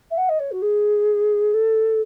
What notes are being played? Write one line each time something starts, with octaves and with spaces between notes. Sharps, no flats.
E5
F#5
D#5
C#5
F#4
G#4
A4